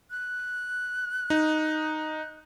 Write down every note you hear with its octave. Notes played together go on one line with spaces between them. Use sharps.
F#6
D#4